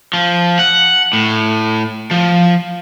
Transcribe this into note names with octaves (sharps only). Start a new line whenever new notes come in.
F3
F#5
A2
F3